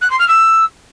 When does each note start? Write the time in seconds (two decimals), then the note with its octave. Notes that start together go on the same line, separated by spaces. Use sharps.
0.01 F#6
0.10 C6
0.19 F6
0.28 E6